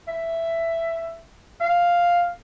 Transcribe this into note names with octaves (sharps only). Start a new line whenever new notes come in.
E5
F5